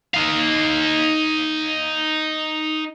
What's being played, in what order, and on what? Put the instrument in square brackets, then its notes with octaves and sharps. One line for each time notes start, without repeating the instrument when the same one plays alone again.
[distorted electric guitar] D#4 F5